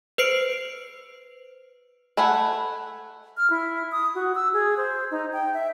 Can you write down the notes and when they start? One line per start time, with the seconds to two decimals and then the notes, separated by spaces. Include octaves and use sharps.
0.18 B4 C5 C7 D7
2.17 A3 B4 F#5 G#5
3.37 F6
3.50 E4
3.92 D#6
4.15 F#4
4.35 E6
4.53 G#4
4.77 C5
5.11 D#4
5.33 G5
5.54 E5